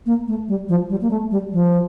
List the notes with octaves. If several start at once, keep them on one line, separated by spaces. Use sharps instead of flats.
A#3
A3
G3
F3
G3
A#3
A3
G3
F3